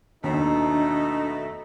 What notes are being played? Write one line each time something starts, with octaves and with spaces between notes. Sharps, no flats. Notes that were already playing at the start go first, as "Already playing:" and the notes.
D#2 B2 A3 D4 D#4